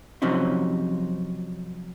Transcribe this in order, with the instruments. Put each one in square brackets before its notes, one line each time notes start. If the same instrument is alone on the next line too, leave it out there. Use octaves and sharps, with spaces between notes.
[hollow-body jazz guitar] C3 F3 F#3 C4 C#4 D#4